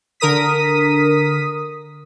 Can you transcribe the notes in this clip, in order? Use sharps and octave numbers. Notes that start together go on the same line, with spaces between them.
D3 A#4 D#6 B6